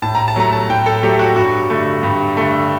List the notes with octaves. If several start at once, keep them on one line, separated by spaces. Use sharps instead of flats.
A2 A5
A#5
A5
F#3 A3 A#5
A5
A2 G5
A4
F#3 A3 G4
F#4
G2 F#4
D3 A3
G2
D3 A3